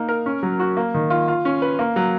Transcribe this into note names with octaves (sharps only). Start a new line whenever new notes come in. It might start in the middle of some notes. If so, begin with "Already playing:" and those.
Already playing: A#3 D#4
A#4
C#4
F#3
F#4
A#3
D#3
F4
F4
C#4
B4
A#3
F#3